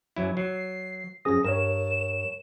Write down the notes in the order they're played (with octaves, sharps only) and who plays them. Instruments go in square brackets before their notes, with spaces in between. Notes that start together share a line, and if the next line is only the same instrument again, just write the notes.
[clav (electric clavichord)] F#2 F#3 E4
[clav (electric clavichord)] F#3 [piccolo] C7
[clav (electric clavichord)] F#2 F3 [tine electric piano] C#4 G#4 D#6 [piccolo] A#6
[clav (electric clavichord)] G2 [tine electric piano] A#4 C#5 [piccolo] E7